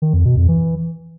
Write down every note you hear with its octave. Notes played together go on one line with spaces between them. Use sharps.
D#3
F2
B2
F2
E3